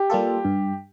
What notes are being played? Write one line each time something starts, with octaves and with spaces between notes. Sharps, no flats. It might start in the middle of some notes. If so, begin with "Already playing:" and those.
Already playing: G4
G3 A#3 F4 A4
G2